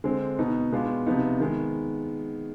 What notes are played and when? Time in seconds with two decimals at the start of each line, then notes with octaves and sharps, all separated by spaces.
0.04 D3 G#3 C4
0.39 B2 B3 D#4
0.72 B2 G#3 B3 D4 F4
1.06 C3 F3 B3 D#4
1.40 D#3 G#3 B3